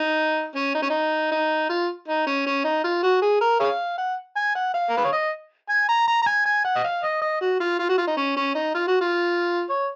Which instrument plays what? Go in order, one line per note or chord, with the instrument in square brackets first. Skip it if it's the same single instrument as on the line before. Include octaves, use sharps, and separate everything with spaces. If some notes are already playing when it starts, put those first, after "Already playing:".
Already playing: [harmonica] D#4
C#4
D#4
C#4
D#4
D#4
F4
D#4
C#4
C#4
D#4
F4
F#4
G#4
A#4
G#4 C#5 F5
F#5
G#5
F#5
F5
A#4
B4
C#5
D#5
G#5
A#5
A#5
A#5
G#5
G#5
F#5
D#5
F5
D#5
D#5
F#4
F4
F4
F#4
F4
D#4
C#4
C#4
D#4
F4
F#4
F4
C#5